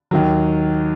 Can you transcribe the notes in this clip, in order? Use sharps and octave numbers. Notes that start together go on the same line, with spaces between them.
D#2 D#3 F#3